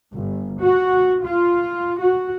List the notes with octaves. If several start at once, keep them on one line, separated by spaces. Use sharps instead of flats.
G1
F#4
F4
F#4